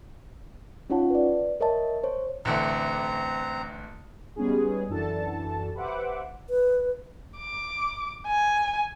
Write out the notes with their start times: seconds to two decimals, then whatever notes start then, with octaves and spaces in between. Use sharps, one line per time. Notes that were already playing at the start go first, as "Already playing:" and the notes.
0.90 C#4 D#4 F4 C#5 F#5 A5
1.10 B4 D5
1.60 A#4 C#5 D#5 E5 A5
2.04 C5 C#5
2.45 A1 D3 A3 C4 A#5
4.36 G3 G#3 B3 C#4 D#4 G#4
4.89 F#2 E3 D4 F#4 A4 A5
5.75 G4 B4 C5 E5 F#5 D6
6.50 B4
7.38 D6
8.27 G#5